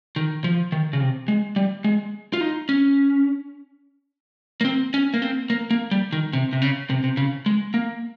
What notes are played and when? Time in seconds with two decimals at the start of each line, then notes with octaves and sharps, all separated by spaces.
0.16 D#3
0.44 F3
0.72 D#3
0.93 C#3
1.00 C3
1.28 G#3
1.56 G3
1.84 G#3
2.34 F4
2.41 D#4
2.69 C#4
4.61 A#3
4.65 C4
4.94 C#4
5.14 A#3
5.22 C4
5.50 A#3
5.71 A#3
5.91 G3
6.13 D#3
6.33 C3
6.53 C3
6.62 C#3
6.90 C3
7.04 C3
7.17 C#3
7.46 G#3
7.74 A#3